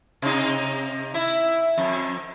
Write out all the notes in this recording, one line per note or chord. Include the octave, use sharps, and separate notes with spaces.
C3 D#4
E4
F2